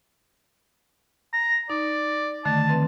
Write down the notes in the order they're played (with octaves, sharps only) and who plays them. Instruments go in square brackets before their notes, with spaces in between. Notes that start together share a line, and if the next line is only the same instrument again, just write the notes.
[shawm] A#5
[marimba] D#4 [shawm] D5
[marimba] D3 D#3 A3 [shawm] A5
[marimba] E3 C4 B4